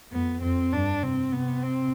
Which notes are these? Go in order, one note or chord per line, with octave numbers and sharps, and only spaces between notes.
F2 B3
F2 C4
G2 D4
C3 C4
C3 B3
C4